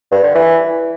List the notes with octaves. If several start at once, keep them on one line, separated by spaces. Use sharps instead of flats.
G2
D3
E3